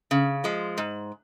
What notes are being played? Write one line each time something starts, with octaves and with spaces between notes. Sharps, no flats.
C#3
F3 G#3
G#2